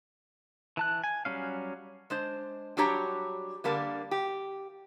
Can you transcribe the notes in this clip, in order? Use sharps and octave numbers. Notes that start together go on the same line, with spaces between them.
E3 A5 F#6
G#5
F#3 G3 C#4 F5
G#3 D4 C5
F#3 G3 D4 G4 C#5 A#5
D3 G3 A#3 D4
G4